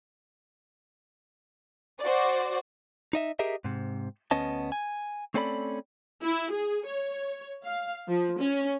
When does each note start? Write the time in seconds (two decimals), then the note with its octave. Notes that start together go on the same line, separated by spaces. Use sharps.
2.00 F#4 C5 D5
3.13 D#4 D#5 E5
3.39 G4 G#4 A#4 D#5 E5
3.65 G#2 C3
4.31 D2 B3 C#4 D#5 A5
4.72 G#5
5.34 A3 C4 C#4 A4 D5 B5
6.24 E4
6.52 G#4
6.87 C#5
7.65 F5
8.09 F3
8.39 C#4